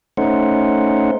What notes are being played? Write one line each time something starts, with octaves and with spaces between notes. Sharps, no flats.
A3 C#4 D#4 C5 F#5